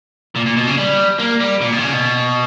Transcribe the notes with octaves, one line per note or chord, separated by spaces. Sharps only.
A#2
A#2
B2
C#3
G3
A#3
G3
A#2
B2
D#3
C#3
B2